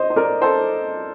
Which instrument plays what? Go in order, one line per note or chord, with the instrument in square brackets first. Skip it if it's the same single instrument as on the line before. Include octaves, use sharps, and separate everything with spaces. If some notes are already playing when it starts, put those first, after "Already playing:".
Already playing: [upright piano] C5 D#5
C5
A#4 D5
A4 C5